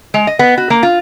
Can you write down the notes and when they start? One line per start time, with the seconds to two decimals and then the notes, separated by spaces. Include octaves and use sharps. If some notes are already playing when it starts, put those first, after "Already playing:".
0.14 G#3
0.27 D#5
0.39 B3
0.58 F#4
0.70 A#3
0.83 F4